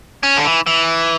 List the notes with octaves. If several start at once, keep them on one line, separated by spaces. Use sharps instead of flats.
C#4
D3
E3
E3